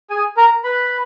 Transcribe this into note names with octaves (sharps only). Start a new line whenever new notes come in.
G#4 G#5
A#4 A#5
B4 B5